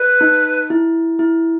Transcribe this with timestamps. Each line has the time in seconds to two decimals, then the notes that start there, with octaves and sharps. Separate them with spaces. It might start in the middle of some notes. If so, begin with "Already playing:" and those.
Already playing: B4
0.21 D#4
0.70 E4
1.19 E4